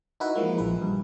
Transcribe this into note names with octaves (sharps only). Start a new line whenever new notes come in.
D#4 E4 F#4 B4
E3 F3 G#3 A#3
A#1 B4
G2